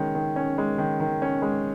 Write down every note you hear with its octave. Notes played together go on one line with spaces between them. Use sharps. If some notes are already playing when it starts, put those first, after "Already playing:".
Already playing: D#3 G#3 C#4
D#3
C#4
G#3
D#3
D#3
C#4
G#3